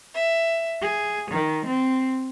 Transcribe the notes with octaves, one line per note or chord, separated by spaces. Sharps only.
E5
G#4
D#3
C4